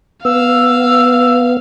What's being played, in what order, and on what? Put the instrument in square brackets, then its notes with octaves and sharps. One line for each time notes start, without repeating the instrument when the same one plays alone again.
[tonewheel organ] B3 [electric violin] F5 [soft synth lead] E6